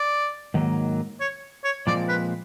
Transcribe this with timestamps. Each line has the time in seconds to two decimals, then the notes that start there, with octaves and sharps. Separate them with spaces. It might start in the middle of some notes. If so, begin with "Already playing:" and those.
Already playing: D5
0.54 G#2 D#3 F#3 A#3
1.21 C#5
1.64 C#5
1.87 A#2 F3 G#3 C4 D5
2.08 B4